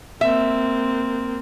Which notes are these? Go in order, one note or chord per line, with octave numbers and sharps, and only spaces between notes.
A#3 C4 E5